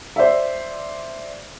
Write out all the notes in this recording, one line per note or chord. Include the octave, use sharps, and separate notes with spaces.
C5 D5 E5